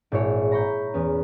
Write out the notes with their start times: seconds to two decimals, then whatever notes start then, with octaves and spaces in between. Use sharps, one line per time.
0.12 G#1 A#2 E4 C#5
0.52 A#5 B5 C#6 G6
0.94 E2 B3 C#4